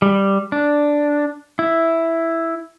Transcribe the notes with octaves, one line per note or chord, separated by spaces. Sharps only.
G3
D4
E4